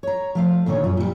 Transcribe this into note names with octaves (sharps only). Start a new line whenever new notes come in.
C#5 A#5
F3 A3 F5
D#2 A#2 D3 D#3 C#5
F#2 F4
A#2 G3